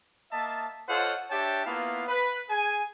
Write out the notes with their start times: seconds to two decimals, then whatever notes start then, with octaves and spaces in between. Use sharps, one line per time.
0.32 A#3 D#5 E5 A5
0.88 F4 A4 C5 C#5 D#5 F#5
1.31 D4 G4 C#5 E5 G5 A5
1.66 A#3 B3 E4 F4 F5
2.08 B4
2.49 G#4 G#5